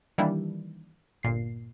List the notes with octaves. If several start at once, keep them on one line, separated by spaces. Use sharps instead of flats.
D#3 E3 G3 A#3 D4 E4
G1 A#2 C7